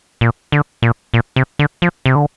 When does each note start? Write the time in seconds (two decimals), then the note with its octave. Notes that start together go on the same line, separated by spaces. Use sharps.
0.21 A#2
0.52 D3
0.82 A#2
1.14 A#2
1.36 C3
1.59 D3
1.82 F3
2.06 C3
2.16 D3